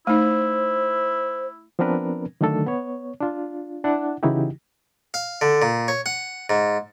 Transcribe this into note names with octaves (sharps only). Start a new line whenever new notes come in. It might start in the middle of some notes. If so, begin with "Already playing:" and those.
A3 D#4 E4 C5
F3 B3 C4 D4 A#4 B4
D3 D#3 F#3 A3 D4 A4
B3 C#5
D4 F4
D4 E4 F#5
C#3 E3 D#4 E4 F#4 G4
F5
D3
A#2
C#5
F#5
G#2